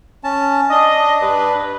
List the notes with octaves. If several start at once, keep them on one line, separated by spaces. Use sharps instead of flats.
C#4 A5
D4 D#5
G2 B4